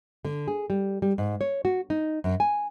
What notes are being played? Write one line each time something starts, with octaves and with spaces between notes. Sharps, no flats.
D3
G#4
G3
G3
G#2
C#5
F#4
D#4
F#2
G#5